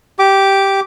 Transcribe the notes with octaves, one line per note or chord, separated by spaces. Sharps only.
G4 D6